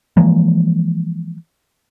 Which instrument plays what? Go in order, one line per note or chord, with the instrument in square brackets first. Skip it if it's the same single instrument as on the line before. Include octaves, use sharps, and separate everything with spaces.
[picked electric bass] E3 F3 G#3 A#3